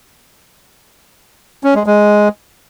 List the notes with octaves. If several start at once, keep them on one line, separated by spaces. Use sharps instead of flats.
C#4
G#3
G#3